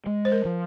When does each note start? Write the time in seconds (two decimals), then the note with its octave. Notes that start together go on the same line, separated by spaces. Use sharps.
0.06 G#3
0.25 C5
0.32 A#4
0.45 F3